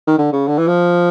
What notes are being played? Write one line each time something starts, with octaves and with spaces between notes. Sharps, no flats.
D#3
D3
C#3
D3
E3
F3